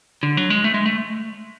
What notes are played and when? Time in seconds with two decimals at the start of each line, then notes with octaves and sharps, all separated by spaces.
0.23 D3
0.37 F#3
0.50 G#3
0.64 A3
0.74 G#3
0.86 A3